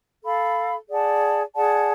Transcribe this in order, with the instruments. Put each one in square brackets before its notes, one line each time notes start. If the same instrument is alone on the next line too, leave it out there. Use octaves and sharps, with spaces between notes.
[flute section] A4 F5 B5
G#4 D5 F#5 A5
G#4 D5 F#5 A5